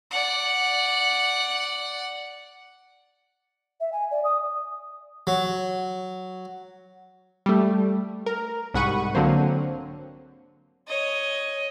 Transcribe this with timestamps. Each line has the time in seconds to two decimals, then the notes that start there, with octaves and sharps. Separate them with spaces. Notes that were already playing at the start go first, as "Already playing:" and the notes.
0.11 D5 F#5
3.81 E5
3.93 G#5
4.11 D5
4.24 D#6
5.27 F#3
7.46 G3 A3
8.26 A#4
8.74 C2 G#2 F#5 B5 C#6 D#7
9.15 D3 F#3 A#3 C4
10.88 C#5 D#5